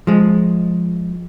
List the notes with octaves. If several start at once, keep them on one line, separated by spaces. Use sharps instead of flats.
F3 G#3